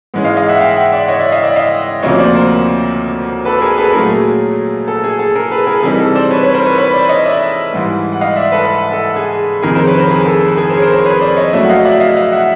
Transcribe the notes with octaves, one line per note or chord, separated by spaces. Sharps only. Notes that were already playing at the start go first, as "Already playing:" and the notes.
G#2 E3 G#3 C#4
D#5 F5
D#5 F5
E5 F#5
F5 G5
E5 F#5
D5 E5
C#5 D#5
D5 E5
D#5 F5
D5 E5
D#5 F5
D2 C3 F3 A#3 C#4 C#5 D#5
C5 D5
A#4 C5
A4 B4
G#4 A#4
A4 B4
A#2 F#3 A3 C#4 G#4 A#4
A4
G#4
A4
G#4 A#4
A4 B4
G#4 A#4
A4
C3 E3 G3 C4 D#4 G#4
A4
C5 D5
B4 C#5
B4 C#5
A#4 C5
B4 C#5
B4 C#5
C5 D5
C#5 D#5
D5 E5
G#2 E3 G3
F#5
D#5 F5
D5 E5
A4 B4
A4
G#4
F2 C3 D#3 G#4 A#4
A#4 C5
B4 C#5
A#4 C5
G#4 A#4
A4
G#4
G#4
A#4 C5
C#5
A#4 C5
A#4 C5
B4 C#5
C5 D5
C#5 D#5
B2 F#3 A3 C#4 D5 E5
F#5
D#5 F5
D5 E5
D#5 F5
D#5 F5
E5 F#5